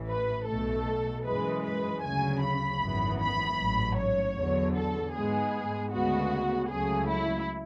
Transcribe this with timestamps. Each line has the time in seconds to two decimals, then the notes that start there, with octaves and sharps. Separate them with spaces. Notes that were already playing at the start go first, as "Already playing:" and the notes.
Already playing: A1 A2 E3
0.09 B4
0.47 B1 B2 A3 A4
1.25 F#2 E3 G#3 B4
1.64 B4
2.03 D2 C#3 F#3 G#5
2.42 B5
2.81 G#1 F#2 E3 B3
3.20 B5
3.59 A1 G#2 F#3
3.98 C#5
4.37 E2 D3 F#3
4.75 A4
5.14 G#2 G#3 B3 G#4
5.92 D2 C#3 G#3 B3 F#4
6.70 C#2 C#3 F#3 A3 G#4
7.09 E4